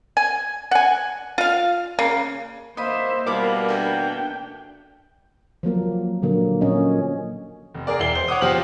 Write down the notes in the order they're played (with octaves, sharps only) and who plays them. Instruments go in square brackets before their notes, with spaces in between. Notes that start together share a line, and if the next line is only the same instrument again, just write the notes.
[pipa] G#5
F#5 G#5
F4 F5
C#3 A#3
[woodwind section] A#3 [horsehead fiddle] C5 E5 [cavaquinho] D#5 B5
[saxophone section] B2 A#3 [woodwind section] G3 A#4 [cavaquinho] E4 B5 D6 [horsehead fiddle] F5
[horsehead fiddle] D4 G5 [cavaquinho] A4 E5 G#5
[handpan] F3 F#3 A#3 A#4
A#2 D3 F#3 A#3
A#2 C#4 C#5 D#5
[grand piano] F1
G#4 A#4 D5
E1 E4 C7 G7
C5
C#5 F#5 D6 D#6
F#1 F3 F4 G4 F5 F#7